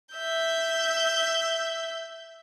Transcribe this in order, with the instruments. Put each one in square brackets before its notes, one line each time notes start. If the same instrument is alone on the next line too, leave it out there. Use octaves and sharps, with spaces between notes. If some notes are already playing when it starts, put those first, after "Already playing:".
[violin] E5 G6